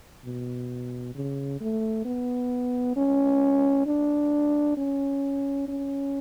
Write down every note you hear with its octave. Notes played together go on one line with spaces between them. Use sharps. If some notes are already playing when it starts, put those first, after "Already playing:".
B2
C#3
A3
B3
C#4
D4
C#4
C#4